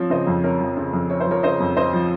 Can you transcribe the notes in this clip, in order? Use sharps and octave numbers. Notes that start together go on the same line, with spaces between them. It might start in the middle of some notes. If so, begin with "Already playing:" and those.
Already playing: F3 C4 C#5
C#3 C5 D#5
F2
C4 A#4 C#5
F3
C#3
F2
C4 C#5
C5
F3 A#4 C#5
C#3 C5 D#5
F2
C4 C5 D#5
F3